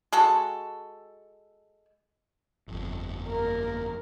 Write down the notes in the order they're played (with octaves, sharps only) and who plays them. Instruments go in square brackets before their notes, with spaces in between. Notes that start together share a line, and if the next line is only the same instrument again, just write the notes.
[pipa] G#3 F#4 A4
[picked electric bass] G1 F2
[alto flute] A#3 [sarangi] A#4